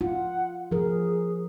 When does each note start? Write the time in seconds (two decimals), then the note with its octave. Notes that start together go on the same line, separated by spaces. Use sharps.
0.01 F4 F#5
0.71 F3 G#4 A#4